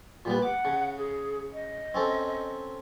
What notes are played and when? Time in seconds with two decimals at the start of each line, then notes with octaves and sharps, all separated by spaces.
0.25 A#2 G3 B3
0.42 F#5 D6
0.65 C#3
0.97 G#4
1.53 D#5
1.94 C4 C#4 A4